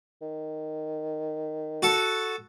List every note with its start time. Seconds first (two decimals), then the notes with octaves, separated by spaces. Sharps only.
0.22 D#3
1.82 F#4 A4